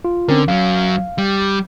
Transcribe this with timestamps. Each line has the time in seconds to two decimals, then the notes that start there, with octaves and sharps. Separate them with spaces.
0.05 F4
0.28 D3 C4 C#4 A#4
0.48 F#2 F#3 F5
1.18 G3